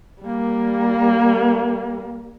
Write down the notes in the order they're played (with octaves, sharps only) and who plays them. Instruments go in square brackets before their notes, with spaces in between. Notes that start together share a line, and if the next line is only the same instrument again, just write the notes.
[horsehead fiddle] G3 A#3